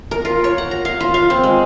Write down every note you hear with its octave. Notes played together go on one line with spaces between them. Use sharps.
A#4
F4
C#5
F#5
A#5
F5
F4
F5
C4
G#3